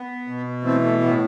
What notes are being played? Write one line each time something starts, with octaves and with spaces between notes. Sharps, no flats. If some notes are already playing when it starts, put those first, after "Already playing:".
Already playing: B3
B2
E3 A3 C4
A3
A2 B3